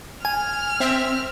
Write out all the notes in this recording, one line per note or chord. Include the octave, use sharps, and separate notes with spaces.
G#5 F6
C4 E5